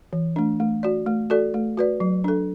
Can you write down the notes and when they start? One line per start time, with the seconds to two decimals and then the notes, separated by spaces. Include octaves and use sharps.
0.13 E3
0.36 A3 D4
0.60 A3
0.83 F#4 D5
1.06 A3
1.30 F#4 A4 D5
1.54 A3
1.78 F#4 B4 D5
2.00 F#3
2.24 D4 A4